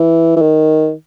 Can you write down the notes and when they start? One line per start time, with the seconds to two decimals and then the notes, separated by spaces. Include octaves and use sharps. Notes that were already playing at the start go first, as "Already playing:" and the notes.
Already playing: E3
0.36 E3
0.41 D#3